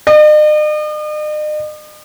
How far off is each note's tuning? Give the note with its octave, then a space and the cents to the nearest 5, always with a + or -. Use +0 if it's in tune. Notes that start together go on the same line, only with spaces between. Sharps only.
D#5 -45